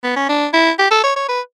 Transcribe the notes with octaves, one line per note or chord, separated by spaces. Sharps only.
B3
C#4
D4
E4
G4
A4
C#5
C#5
B4